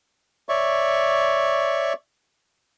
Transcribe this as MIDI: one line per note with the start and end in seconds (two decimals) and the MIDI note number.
0.49 1.93 73
0.49 1.93 74
0.49 1.93 76
0.49 1.93 85